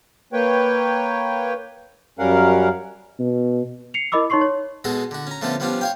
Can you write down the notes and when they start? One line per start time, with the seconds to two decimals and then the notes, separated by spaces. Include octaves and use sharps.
0.33 A#3 B4 C#5 G5
2.19 F#2 G3 C#4 A#4 F5 F#5
3.19 B2
3.94 C7 C#7 F7
4.12 E4 A#4 D#5 B5 D6 E6
4.30 D#4 C#5 C6 C#6 C7
4.41 C#5
4.84 B2 G#3 F#4 G#4 A4
5.11 D3 F#4
5.27 C#4 A#5
5.42 D3 F3 A3 B3 C#4 A4
5.60 F3 G3 B3 C#4 D4 F4
5.81 C#5 F5 G5